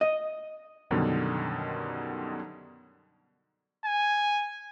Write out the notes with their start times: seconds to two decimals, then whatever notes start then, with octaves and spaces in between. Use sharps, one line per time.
0.01 D#5
0.91 F#2 B2 D3 D#3 G3
3.85 G#5